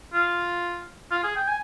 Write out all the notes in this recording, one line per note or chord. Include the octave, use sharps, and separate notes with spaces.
F4
F4
G#4
G5
G#5